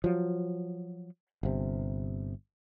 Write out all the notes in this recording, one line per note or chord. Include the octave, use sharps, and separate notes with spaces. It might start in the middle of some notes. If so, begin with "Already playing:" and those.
F3 F#3
G1 C3